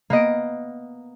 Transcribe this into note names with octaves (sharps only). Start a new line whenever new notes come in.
A#3 B3 D#5 D7